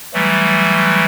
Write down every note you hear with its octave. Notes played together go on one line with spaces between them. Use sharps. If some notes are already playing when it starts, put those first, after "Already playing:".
E3 F#3 G3 A3